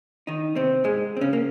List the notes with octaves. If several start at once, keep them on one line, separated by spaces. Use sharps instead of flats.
D#3 D#4
C3 C4
G#2 G#3
C4
C#3 C#4
A#3